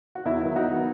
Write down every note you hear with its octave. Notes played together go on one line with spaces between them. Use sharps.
F#4
E2 E4
D#3 F#3 B3
E2 D#4 F#4
D#3 F#3 B3